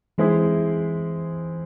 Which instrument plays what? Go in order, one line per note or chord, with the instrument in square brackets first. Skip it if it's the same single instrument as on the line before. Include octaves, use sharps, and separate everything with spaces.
[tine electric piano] E3 [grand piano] G#3 C4 E4 G#4 C5